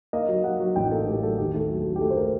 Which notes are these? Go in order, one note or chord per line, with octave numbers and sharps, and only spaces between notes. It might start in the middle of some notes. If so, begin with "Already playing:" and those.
A#3 D#5
F#3
F#3 F#5
F#3
A1 G5
A#3 A4
A2 G4
F#3 A4
D#2 G4
A3
A4
F#3
A4
F#3
G4
A3 A4
C5
A#4